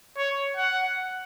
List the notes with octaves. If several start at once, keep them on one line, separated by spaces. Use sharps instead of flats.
C#5
F#5